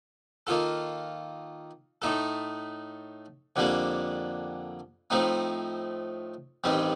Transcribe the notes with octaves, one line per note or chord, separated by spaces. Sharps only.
D#3 A#3 F4 A4
A2 A3 D#4 A4
F2 D3 G3 A#3 D4
A2 F3 A3 C4 D#4
A1 G2 D#3 G3 C4